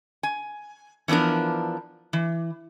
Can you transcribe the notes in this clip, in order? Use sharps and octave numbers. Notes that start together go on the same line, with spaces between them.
G#5
E3 F3 B3 D4 A#4
E3